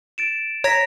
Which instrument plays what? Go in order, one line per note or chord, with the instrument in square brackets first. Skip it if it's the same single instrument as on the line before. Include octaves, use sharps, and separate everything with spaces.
[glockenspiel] A6 D7 E7
[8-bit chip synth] C#5 [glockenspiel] A#5 A#6 B6